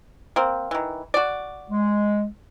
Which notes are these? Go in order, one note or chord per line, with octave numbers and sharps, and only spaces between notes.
A#3 C4
D#3 E3
F#4 D5
G#3